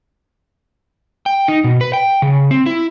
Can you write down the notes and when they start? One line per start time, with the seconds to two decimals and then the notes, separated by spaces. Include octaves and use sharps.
1.26 G5
1.48 D#4
1.64 B2
1.81 B4
1.93 G5
2.22 C#3
2.51 C4
2.66 E4